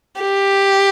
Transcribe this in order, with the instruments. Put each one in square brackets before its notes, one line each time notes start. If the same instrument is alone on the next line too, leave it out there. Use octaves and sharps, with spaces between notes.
[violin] G4